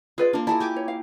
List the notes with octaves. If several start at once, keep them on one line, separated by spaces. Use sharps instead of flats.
F4 G#4 B4 D5
A#3 D4 F4
E4 G#4 A#4 D5 A5
G4 G#5 D6
C#5
F5